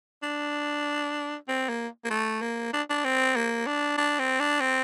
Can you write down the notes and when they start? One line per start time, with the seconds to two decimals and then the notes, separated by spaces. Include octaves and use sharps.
0.23 D4
1.48 C4
1.69 A#3
2.05 A#3
2.10 A3
2.41 A#3
2.73 D4
2.90 D4
3.05 C4
3.36 A#3
3.67 D4
3.98 D4
4.19 C4
4.40 D4
4.60 C4